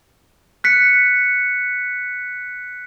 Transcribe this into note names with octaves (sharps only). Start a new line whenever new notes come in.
F#6 B6 C#7